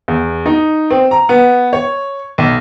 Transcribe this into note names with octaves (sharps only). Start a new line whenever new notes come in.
E2
D#4
C4
A#5
B3
C#5
B1